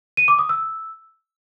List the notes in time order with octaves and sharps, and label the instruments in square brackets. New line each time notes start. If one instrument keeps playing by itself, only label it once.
[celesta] D#7
D6
D#6
E6